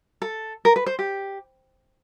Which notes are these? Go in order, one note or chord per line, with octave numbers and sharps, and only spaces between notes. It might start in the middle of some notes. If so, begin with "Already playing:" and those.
A4
A#4
B4
C5
G4